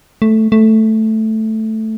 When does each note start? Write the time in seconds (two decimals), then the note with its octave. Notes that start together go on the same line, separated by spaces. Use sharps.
0.22 A3
0.52 A3